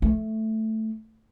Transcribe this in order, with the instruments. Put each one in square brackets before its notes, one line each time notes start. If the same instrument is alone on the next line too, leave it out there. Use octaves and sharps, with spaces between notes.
[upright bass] A3